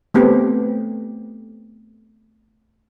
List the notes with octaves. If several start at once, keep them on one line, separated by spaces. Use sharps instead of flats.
A3 B3 C4 G4 A4